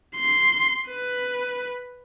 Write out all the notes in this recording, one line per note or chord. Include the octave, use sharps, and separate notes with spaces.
C6
B4